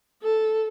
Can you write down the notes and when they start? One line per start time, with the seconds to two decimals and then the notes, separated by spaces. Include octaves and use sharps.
0.22 A4